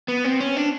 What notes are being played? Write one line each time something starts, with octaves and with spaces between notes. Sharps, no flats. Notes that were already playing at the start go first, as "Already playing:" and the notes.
B3
C4
C#4
D4